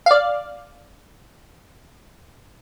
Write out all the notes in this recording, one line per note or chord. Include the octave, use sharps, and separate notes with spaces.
D5 F5